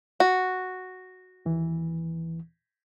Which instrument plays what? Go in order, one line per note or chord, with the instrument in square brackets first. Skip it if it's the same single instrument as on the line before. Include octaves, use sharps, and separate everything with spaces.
[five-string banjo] F#4
[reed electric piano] D#2 E3